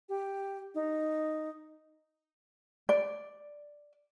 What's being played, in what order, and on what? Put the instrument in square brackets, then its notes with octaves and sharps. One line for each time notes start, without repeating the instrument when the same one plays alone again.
[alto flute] G4
D#4
[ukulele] D5